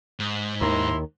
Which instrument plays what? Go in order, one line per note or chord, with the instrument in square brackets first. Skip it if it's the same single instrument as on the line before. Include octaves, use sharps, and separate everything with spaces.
[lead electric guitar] G#2
[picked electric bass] D#2 D#3 [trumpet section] E4 A#5 C6